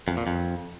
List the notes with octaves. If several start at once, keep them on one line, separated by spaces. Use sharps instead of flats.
F2
A#2
F2